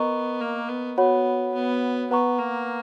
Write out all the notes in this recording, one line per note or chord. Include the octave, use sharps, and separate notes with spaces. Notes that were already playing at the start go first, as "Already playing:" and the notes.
Already playing: B3 A#4 D#5 A#5 C#6
A#3
B3
B3 F#4 C#5 F#5 B5
B3
B3 B4 F#5 A#5 C#6
A#3